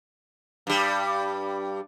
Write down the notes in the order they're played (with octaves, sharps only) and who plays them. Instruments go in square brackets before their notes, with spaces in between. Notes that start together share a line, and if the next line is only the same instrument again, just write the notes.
[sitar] G2 G3